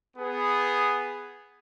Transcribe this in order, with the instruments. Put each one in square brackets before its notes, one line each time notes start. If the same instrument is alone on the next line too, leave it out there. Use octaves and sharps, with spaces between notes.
[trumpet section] B3 G#4